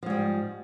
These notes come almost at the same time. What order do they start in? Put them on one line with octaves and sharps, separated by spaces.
F3 G#2 G3